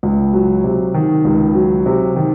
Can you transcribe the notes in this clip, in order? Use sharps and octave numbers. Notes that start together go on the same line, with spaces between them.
C#2
F#3
C3
D#3
C#2
F#3
C3
D#3